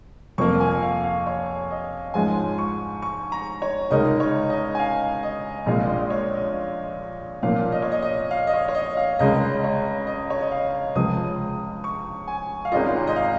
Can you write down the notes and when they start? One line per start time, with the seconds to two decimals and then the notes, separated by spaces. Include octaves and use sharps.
0.38 F2 F3 A#3 C#6
0.60 G#5
0.82 F5
1.04 F5
1.27 C#5
1.70 D#5
2.14 G#2 F3 G#3 C#4 F4 G#5
2.58 C#6
3.02 C#6
3.32 A#5
3.62 C#5
3.90 C#2 C#3 G#3 D#4 A#4 D#5
4.20 C#5
4.50 D#5
4.75 G#5
4.79 F5
5.23 D#5
5.66 A#1 A#2 G#3 F4 F5
5.89 D#5
6.10 C#5
6.33 D#5
7.43 A#2 F3 A#3 C#4 F5
7.72 D#5
7.82 C#5
7.92 D#5
8.02 D#5
8.31 F5
8.47 D#5
8.54 C#5
8.68 C#5
8.75 D#5
8.97 F5
9.19 C#2 C#3 G#3 C#4 D#5
9.64 C#5
10.07 D#5
10.30 C#5
10.41 D#5
10.51 F5
10.95 C#2 C#3 F3 G#3 C#4 D#6
11.84 C#6
12.28 G#5
12.65 F5
12.72 G#1 G#2 G#3 C#4 F4 D#5
13.07 D#5
13.16 F5